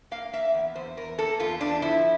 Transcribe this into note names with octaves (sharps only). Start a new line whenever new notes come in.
A#3 F5
A#3 E5
E2
E2 C5
E2 A#4
A#3 A4
E2 F4
E2 D4
F3 E4